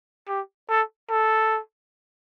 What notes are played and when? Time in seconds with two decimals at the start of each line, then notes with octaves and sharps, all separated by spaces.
0.28 G4
0.69 A4
1.10 A4